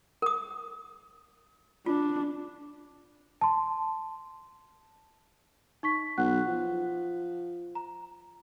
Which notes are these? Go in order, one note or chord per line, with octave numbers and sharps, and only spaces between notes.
A#4 D#6
D4 F4
A5 C6
D#4 C#6 B6
B1 F#5 F#6
F3
A#5